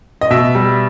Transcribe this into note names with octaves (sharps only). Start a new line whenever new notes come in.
D#5
B2 E5
G3